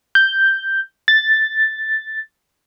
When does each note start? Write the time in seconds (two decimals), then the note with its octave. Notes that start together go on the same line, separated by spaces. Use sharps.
0.15 G6
1.08 A6